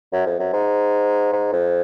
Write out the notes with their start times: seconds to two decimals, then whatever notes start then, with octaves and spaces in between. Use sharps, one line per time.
0.13 F#2
0.26 F2
0.39 F#2
0.53 G#2
1.33 G#2
1.52 F2